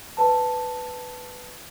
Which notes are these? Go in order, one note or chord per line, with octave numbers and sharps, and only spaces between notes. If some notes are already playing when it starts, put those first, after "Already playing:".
B4 A5